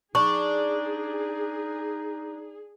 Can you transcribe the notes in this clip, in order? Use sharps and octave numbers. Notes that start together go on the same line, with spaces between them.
D4 D#4 G#4 C#6